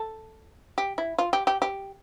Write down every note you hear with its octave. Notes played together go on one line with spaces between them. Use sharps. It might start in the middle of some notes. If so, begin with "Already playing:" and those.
Already playing: A4
G4
E4
F4
G4
G4
G4